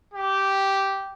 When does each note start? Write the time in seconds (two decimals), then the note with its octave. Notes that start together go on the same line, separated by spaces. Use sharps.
0.14 G4